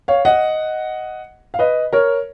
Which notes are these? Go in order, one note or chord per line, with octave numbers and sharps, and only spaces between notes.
C#5 F5
D#5 F#5
F5
B4 D#5
A#4 C#5